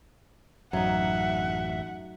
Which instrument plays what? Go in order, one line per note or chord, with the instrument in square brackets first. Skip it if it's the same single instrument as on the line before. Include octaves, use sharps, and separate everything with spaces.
[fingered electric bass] A1 F#2 [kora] F#3 D#4 [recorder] E5 [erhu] F#5